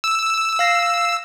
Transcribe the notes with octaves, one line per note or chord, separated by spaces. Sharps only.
E6
F5 A#6 C7